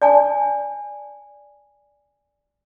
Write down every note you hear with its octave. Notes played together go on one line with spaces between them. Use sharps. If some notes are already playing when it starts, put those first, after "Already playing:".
D5 G#5 A5